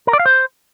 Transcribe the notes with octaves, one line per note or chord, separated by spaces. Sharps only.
A#4
D5
F5
C5